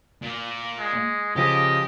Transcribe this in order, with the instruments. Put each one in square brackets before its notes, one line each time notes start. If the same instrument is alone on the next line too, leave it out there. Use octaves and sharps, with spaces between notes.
[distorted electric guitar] A#2
[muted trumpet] G#3
[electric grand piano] C#3 F3 G#4 [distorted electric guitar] G4 [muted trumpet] D#5